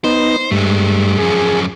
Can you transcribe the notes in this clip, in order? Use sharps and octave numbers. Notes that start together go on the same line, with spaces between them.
B3 D#4 C5
G2 G#3 A3
F#2 F3 G#4